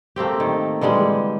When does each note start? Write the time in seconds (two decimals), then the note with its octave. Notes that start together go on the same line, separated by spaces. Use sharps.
0.16 A3 A#3 C4 G4
0.40 D#3
0.81 D3 E3 G3 G#3